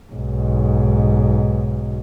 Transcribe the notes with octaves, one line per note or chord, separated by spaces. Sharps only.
B1 G#2